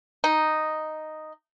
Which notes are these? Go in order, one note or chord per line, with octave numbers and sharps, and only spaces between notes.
D#4